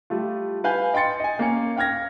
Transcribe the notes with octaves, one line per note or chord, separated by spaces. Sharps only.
G3 A3 F4
B4 F5 G#5 G6
D#5 G5 C6 A6 C#7
D#5 G#5
A#3 C#4 C#7
F5 G5 F6 G#6 A#6